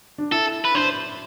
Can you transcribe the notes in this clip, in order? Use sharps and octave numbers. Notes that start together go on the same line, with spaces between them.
D4
E4 A4
B4
D4 C5